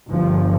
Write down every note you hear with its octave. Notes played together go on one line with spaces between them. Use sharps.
G1 G2 F3